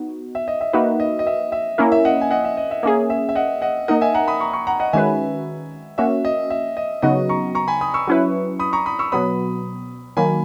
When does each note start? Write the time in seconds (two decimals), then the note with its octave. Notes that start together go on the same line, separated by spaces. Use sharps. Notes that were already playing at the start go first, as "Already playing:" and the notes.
Already playing: B3 D#4 F#4
0.35 E5
0.48 D#5
0.61 E5
0.73 A#3 D#4 F#4 B4 E5
1.00 D#5
1.19 D#5
1.27 E5
1.52 E5
1.78 A#3 C#4 E4 A#4
1.92 E5
2.05 D#5 F#5
2.21 G#5
2.31 D#5 F#5
2.44 E5
2.57 D#5
2.71 E5
2.83 A#3 C#4 G#4 E5
3.10 E5
3.29 E5
3.35 D#5 F#5
3.62 D#5 F#5
3.88 A#3 D#4 A#4 D#5 F#5
4.01 E5 G#5
4.14 F#5 A#5
4.28 B5 D#6
4.40 A#5 C#6
4.53 A#5 C#6
4.67 F#5 A#5
4.80 D#5 F#5
4.93 D#3 G#3 C#4 F#4 B4 E5 G#5
5.98 A#3 C#4 F#4 E5
6.25 D#5
6.50 E5
6.77 D#5
7.02 C#3 F#3 B3 D#4 F#4 D#5
7.29 A#5 C#6
7.55 A#5 C#6
7.68 G#5 B5
7.81 B5 D#6
7.94 C#6 E6
8.07 F#3 C#4 E4 B4
8.59 B5 D#6
8.73 A#5 C#6
8.86 B5 D#6
8.99 C#6 E6
9.12 B2 F#3 B3 B5 D#6
10.17 D#3 F#3 A#3 G#5 B5